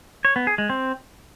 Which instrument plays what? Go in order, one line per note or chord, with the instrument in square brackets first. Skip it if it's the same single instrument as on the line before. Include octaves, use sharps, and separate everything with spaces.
[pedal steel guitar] C#5
B3
G#4
G#3
C4